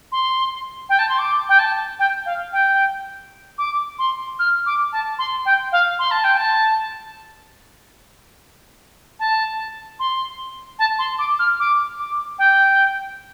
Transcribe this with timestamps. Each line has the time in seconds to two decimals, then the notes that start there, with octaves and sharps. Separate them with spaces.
0.12 C6
0.89 G5
0.99 A5
1.09 C6
1.19 D6
1.49 G5
1.59 A5
1.99 G5
2.26 F5
2.53 G5
3.58 D6
3.99 C6
4.39 F6
4.66 D6
4.93 A5
5.18 C6
5.45 G5
5.72 F5
5.99 C6
6.11 A5
6.24 G5
6.37 A5
9.19 A5
9.99 C6
10.79 A5
10.99 C6
11.19 D6
11.39 F6
11.60 D6
11.99 D6
12.39 G5